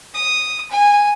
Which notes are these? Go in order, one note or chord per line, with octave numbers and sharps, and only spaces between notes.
D#6
G#5